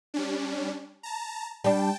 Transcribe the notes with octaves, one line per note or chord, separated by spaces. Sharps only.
G3 C#4 D4
A5 A#5
G3 D4 G5 A5